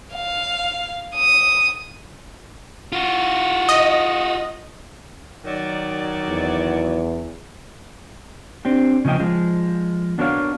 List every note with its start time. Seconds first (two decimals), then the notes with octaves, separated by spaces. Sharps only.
0.15 F5
1.15 D#6
2.92 F4 F#4
3.69 D#5
5.44 D#3 F#3 D5
6.29 E2
8.65 C4 D4 G4
9.05 C#3 F3 A#3 D#5 G5
9.20 F3 G#3
10.18 B3 D4 F#4 A#4 C#5 F5